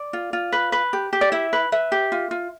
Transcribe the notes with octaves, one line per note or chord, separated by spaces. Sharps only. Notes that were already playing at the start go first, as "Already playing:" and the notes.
Already playing: D5
F4
F4
B4
B4
G4
G4
D5
E4 E5
B4
B4 E5
G4
F4
F4